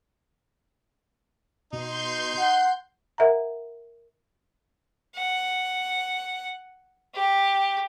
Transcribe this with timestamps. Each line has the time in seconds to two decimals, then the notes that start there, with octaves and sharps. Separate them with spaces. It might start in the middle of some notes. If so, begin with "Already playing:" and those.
1.73 B2 D#4 C6 G6
2.38 F#5
3.18 A#4 E5 F#5 A#5
5.16 F#5
7.14 G4